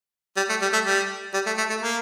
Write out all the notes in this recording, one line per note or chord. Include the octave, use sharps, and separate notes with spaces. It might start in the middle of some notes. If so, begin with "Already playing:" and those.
G3
A3
G3
A3
G3
G3
A3
A3
A3
A#3